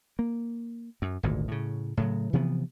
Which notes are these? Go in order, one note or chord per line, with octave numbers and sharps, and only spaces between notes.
A#3
F#2
G#1 D2 A#2
A2 C#3
A2 C#3 F#3
C3 E3 F3 B3